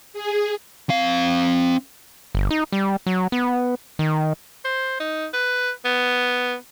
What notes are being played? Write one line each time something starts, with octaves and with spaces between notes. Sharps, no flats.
G#4
C4 F5
G1
D#4
G3
F#3
B3
D#3
C5
D#4
B4
B3